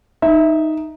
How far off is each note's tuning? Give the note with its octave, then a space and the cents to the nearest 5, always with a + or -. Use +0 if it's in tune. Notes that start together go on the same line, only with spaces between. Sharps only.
D#4 +0 E5 -10